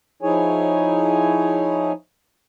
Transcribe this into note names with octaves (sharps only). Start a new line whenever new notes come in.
F3 D#4 E4 G#4 C#5 G#5